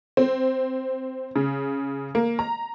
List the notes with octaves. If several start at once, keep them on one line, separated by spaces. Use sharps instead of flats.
C4
C#3
A#3
A#5